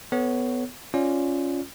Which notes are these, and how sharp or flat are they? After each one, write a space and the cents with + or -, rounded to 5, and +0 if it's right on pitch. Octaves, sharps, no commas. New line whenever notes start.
B3 +15 A4 +0 C#5 +0
C#4 +0 F4 +0 D5 +0